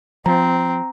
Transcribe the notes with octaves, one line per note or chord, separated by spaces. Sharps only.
F3 C4 A#5